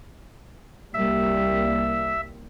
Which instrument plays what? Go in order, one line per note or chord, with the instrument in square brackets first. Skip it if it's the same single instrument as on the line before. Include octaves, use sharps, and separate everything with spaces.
[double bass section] C2 G3 A#3 [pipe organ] E5